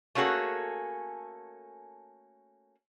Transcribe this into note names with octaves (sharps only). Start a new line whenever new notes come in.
A3 A#3 C#4 F#4 G#4 A4